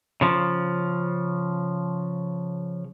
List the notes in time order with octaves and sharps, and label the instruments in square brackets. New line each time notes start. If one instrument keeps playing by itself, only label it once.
[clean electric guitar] C#3 F3